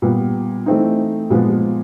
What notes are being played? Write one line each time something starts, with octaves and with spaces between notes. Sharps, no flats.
A#2 G3 B3
E3 A3 C4 D#4
A#2 F3 G#3 B3